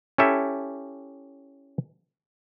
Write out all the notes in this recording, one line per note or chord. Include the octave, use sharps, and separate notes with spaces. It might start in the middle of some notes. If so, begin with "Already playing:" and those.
C#4 E4 G4 A4 E5